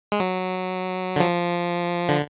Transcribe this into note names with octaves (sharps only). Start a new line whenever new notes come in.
G#3
F#3
D3
F3
D3